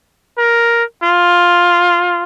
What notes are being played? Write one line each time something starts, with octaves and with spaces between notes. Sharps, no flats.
A#4
F4